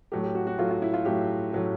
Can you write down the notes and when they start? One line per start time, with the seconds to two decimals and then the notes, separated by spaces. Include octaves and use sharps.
0.12 A2 F#3 A3 G4
0.23 G4
0.35 F#4
0.47 F#4
0.58 A2 F#3 A3 F4
0.70 F4
0.82 E4
0.94 F4
1.05 A2 F#3 A3 G4
1.53 A2 F#3 A3